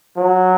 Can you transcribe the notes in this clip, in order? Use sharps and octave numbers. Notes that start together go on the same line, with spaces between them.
F#3